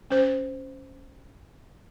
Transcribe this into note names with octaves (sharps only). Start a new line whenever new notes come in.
C#4 C5